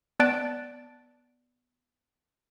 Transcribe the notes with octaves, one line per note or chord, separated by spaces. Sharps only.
B3 D5 A5 F#6 A6 D7